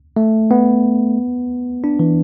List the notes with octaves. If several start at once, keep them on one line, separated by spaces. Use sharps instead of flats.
A3
B3
D4
E3